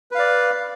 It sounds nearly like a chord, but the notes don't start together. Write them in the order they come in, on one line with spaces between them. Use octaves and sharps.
B4 F5 D5